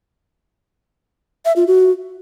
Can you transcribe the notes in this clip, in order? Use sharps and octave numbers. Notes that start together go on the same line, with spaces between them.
E5
F4
F#4